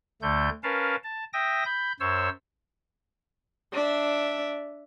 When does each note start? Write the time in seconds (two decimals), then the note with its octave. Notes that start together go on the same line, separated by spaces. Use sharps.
0.22 D2 D3 A3 G6
0.63 C#4 A#4 B4 F5 A5
1.04 A5
1.33 E5 G5 D#6 A#6
1.65 B5 G6
2.00 F#2 C5 C#5 E6
3.72 D4 E5